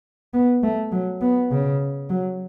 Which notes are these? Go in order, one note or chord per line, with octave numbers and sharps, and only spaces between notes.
B3
A3
F#3
B3
C#3
F#3